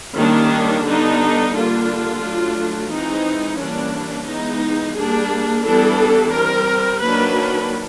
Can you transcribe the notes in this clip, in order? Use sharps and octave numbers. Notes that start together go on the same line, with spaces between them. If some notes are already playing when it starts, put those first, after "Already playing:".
D#3 G3 A#3 C#4 D4
D3 G3 B3 D4 D#4
D3 G3 A#3 D4 F4
F#3 A3 D4
E3 G#3 C4 D#4
E3 G3 A#3 C#4 D4
E3 G#3 B3 D#4
G3 A#3 D4 G#4
E3 G3 B3 D4 A4
G3 C4 A#4
D#3 F#3 A#3 D4 B4